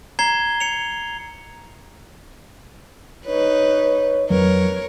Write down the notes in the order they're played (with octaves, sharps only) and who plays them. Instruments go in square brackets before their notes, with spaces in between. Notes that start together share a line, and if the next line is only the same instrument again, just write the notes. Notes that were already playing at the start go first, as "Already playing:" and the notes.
[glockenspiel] A#5 G#6 C7 G7
C#7 F7
[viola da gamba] D#4 B4 [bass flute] C#5
[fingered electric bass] F2 F#3 [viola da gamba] A#4 C#5 [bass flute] B4